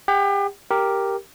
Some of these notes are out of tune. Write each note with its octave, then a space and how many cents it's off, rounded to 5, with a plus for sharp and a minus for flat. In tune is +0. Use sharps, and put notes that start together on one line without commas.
G4 +35 G5 -45
G4 +0 A#4 +0